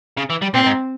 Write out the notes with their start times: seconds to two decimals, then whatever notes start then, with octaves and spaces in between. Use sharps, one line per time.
0.17 C#3
0.30 E3
0.42 G3
0.54 A#2 C4
0.66 G#2